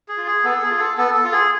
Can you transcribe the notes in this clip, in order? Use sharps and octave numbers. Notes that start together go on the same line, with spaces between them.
G#4
F4
G#4
B3 A4
G#4
F4
A4
B3 A4
A4
F4
G#4